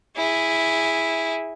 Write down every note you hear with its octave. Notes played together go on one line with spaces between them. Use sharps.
E4 G#4